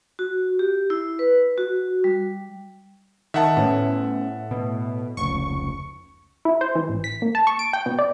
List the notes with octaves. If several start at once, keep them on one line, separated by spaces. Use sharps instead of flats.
F#4
G4
E4
B4
F#4
G3
D#3 E5 F#5 A5
A2 B3 C#4
B2
F1 C#2 C#6
E4
C5
E3
A1
B6
A#3
A5
C#6
D7
G5
B2
D5